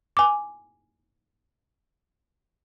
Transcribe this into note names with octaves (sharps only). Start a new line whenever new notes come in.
G#5 D6